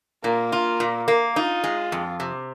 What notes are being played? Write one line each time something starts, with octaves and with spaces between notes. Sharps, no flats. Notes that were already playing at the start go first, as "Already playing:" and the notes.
A#2 A#3
F4
A#2
A#3
D#4 F4
G#3
F2
C3